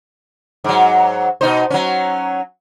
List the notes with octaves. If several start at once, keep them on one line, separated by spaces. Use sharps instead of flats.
G#2 F#3
B2 D#4 C5
F#3 C#4